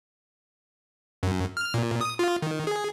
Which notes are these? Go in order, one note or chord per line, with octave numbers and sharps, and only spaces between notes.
F#2
F6
A#2
D#6
F4
D#3
G#4